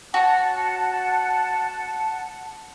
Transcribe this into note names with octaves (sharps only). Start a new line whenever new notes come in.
F#4 C#5 F#5 A5